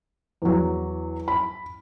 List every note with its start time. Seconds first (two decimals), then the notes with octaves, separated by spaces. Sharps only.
0.42 E2 F#3
1.28 B5